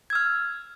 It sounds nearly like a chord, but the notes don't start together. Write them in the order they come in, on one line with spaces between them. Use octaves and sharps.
G#6 E6 F6